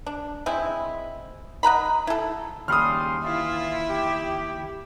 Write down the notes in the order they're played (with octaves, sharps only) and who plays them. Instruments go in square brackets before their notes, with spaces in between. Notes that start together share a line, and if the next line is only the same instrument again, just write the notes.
[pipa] D4
G#3 C4 E4
D#5 F#5 A#5 B5
E4 A4
[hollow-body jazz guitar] D#2 B5 [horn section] C#3 G3 C6 [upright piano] D#6 F6
[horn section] E3 F4 [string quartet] E4 E5
[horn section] G4